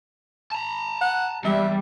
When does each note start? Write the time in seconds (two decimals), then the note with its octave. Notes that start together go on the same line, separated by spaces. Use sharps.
0.52 A5 A#5
1.01 F#5
1.44 E2 G3 E5